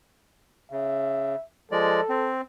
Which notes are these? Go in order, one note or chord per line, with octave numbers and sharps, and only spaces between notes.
C#3 E5
F3 G#3 A4 D5
C4